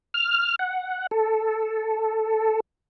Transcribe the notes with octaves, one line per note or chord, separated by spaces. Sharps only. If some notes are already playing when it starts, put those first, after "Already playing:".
F6
F#5
A4